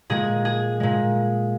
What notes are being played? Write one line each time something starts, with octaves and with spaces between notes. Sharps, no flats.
A#2 G#3 G#4
G#4
A#2 G#3